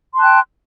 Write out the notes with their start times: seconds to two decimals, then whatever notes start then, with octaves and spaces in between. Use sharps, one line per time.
0.13 C6
0.16 A5
0.19 F#6
0.22 G5